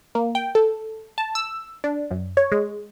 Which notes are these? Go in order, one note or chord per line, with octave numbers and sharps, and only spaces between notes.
A#3
G5
A4
A5
E6
D4
F#2
C#5
G#3